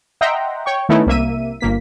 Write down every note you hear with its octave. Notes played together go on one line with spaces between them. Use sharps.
D#5 E5 F#5 G5 A#5 C6
C#5 G5 C#6
D#3 A3 B3 C#4 D#4 E4
C2 A#3 E5 D#7
G1 A#3 B6